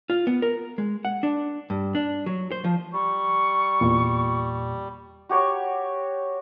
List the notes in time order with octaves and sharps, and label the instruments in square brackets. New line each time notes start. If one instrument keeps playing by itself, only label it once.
[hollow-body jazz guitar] F4
B3
A#4
G#3
F#5
D4
G2
D4
F#3
C5
F3
[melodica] G3 [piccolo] C#6
[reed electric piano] E2 A#2
[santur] F#4 G4 C#5 C#6